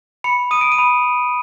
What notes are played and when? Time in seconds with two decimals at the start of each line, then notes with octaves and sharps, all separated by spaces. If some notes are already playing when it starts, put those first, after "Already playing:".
0.24 B5 C#7
0.51 D#6 D#7
0.61 D7
0.72 D#7
0.78 B5